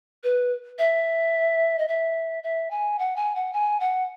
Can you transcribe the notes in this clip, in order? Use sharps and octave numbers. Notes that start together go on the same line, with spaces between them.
B4
E5
D#5
E5
E5
G#5
F#5
G#5
F#5
G#5
F#5